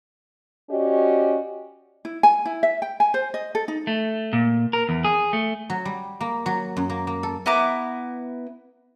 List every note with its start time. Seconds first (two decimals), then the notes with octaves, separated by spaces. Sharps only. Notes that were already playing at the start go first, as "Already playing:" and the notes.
0.70 C#4 F#4 G4 D5 D#5
2.05 E4
2.23 G#5
2.46 E4
2.63 E5
2.82 G5
3.00 G#5
3.14 C5
3.34 D#5
3.55 A4
3.68 D#4
3.87 A3
4.33 A#2
4.73 A#4
4.89 E2
5.04 G#4
5.33 A3
5.70 F#3
5.85 G3
6.21 A#3
6.46 F#3
6.77 F#2
6.89 A#3
7.07 A#3
7.23 A4
7.46 B3 E4 A#5 D6